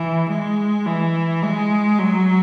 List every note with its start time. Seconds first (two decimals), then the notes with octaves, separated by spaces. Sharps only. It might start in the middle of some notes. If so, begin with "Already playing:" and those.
Already playing: E3
0.29 G#3
0.86 E3
1.42 G#3
1.99 F#3